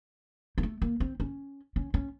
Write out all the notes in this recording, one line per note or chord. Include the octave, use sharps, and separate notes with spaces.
A#3
A3
A#3
C4
C#4
C#4
C#4